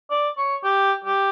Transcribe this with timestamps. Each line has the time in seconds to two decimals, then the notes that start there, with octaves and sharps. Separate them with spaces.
0.11 D5
0.37 C#5
0.64 G4
1.04 G4